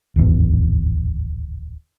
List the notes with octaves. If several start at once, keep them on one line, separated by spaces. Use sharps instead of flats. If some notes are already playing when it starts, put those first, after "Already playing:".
D1 G#1 E2